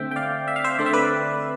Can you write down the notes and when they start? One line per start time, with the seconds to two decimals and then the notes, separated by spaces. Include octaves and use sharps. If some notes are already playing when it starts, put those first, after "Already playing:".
Already playing: D3 A3 C4 E5 G5
0.11 G5
0.16 D5 F5
0.48 E5
0.56 F5
0.64 C5 E5
0.79 D3 A3 C4 D5
0.86 E5
0.93 B4 D5